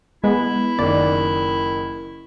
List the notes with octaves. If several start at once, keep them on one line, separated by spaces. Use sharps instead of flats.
G#3 B3 E4
F#1 D#3 D5